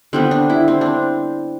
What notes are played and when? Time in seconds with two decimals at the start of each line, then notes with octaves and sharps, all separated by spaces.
0.13 D3 G3 B3 C4
0.31 D4
0.50 E4
0.68 C4
0.81 C4 D4